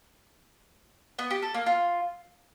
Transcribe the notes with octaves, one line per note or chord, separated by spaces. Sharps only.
B3
G4
A4
A#3
F4